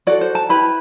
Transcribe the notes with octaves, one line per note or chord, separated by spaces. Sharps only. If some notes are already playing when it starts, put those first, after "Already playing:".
F#4 A4 D5
C5
A5
E4 G4 B4 B5